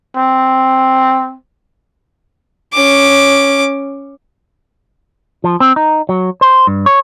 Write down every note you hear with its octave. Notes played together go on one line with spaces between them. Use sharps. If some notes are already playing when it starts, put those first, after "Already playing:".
C4
C#4 D6
F3
C4
D#4
F#3
C5
G2
C#5